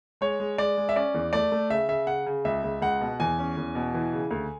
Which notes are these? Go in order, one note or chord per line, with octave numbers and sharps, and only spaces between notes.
G#3 C#5
G#3
G#3 D5
G#3
E5
C#4 D5
E2
A3 D5
A3
C#3 E5
C#3 E5
C#3 F#5
C#3
C#2 E5
C#2
C#2 F#5
B2
E2 G#5
C#4
E2
B2
E3
C#3
D2